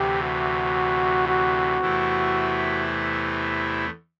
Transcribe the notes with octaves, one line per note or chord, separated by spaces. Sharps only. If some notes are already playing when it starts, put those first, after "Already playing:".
Already playing: D2 C3 E3 G4
F#4
F#4
E2 C3 E3 A3 E4